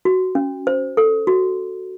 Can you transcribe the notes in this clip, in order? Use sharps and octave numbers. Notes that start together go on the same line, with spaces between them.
F#4
C#4
C5
A4
F#4